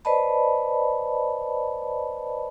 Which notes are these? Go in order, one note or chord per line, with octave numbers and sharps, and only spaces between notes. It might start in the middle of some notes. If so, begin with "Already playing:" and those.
B4 C5 D5 D#5 A5 B5